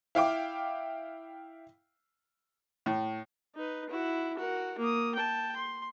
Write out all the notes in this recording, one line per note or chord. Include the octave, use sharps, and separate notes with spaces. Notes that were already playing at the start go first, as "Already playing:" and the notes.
E4 F5 G5 D6
A2
D#4 B4
E4 F#4
F#4 A#4
A#3 D#6
G5 A5
C6